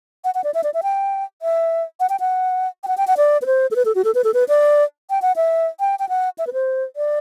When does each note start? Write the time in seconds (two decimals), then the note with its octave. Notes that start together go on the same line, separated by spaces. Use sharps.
0.24 F#5
0.35 F#5
0.44 D5
0.54 E5
0.64 D5
0.74 E5
0.83 G5
1.42 E5
2.00 F#5
2.10 G5
2.20 F#5
2.84 G5
2.88 F#5
2.98 G5
3.07 F#5
3.17 D5
3.42 B4
3.46 C5
3.71 A4
3.76 B4
3.85 A4
3.95 F#4
4.04 A4
4.15 B4
4.24 A4
4.34 B4
4.48 D5
5.10 G5
5.22 F#5
5.36 E5
5.80 G5
5.99 G5
6.09 F#5
6.38 E5
6.47 B4
6.53 C5
6.96 D5